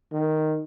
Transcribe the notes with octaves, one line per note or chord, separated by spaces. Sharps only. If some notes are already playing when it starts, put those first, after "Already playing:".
D#3